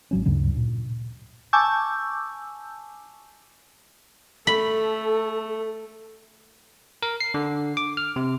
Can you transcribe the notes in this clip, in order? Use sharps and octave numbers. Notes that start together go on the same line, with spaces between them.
G#1 F#3 C#4
D2 G2 C#3 F#3
A#2
G#5 A5 C#6 D6 E6 G6
A3 A4 B5
A#4
C7
D3
D6
F6
C3